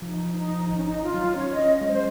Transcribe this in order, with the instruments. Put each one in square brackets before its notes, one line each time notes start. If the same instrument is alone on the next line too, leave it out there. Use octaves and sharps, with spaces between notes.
[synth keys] F3 [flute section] D#4
[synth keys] F3
[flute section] D#4
[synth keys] F3
[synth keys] G#1 [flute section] D#4
[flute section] C#4
D#4
[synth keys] G#1
[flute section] F4
[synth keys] F#3
[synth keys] C#4 [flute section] C#5
[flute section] D#5
[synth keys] C#4
G#3
[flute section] C5